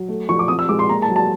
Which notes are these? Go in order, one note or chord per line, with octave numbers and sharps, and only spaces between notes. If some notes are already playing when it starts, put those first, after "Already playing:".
Already playing: F#3
A3
F3 C#6
D6
C4 D#6
E6
G#3 D6
C6
A#3 A#5
A5
F#3
A5